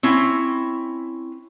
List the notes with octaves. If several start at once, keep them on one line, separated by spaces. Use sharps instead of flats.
C4 C#4 E4